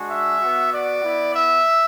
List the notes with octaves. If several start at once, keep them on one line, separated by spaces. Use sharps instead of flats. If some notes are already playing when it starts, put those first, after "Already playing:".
Already playing: G#3 D4 F#4
E5
B3 F#4
D5
B3 E4
E5